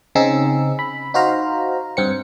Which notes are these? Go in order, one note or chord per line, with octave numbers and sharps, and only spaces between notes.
C#3 C4 D#4 G#4 E6
B5
D#4 F#4 C5 F5 A#5
G2 C4 C#7